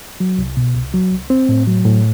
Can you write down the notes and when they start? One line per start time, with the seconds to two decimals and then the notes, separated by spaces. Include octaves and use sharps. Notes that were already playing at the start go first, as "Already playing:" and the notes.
0.20 F#3
0.38 C2
0.57 B2
0.75 C2
0.94 F#3
1.11 C2
1.30 C4
1.49 A2
1.67 F#3
1.85 A2